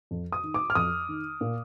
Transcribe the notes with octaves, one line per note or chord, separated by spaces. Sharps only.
F2
D#6
D#3
D6
F6
F2 D#6
D#3
A#2